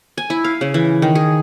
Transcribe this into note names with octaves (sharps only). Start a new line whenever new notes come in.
G#5
E4
F5
C#3
E3
D#3
G#4